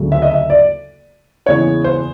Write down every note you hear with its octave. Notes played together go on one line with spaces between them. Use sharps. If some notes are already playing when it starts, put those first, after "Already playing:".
Already playing: D2 C#3 F#3
E5
D#5
E5
D5
E2 C#3 E3 G#3 B3 C#5
C5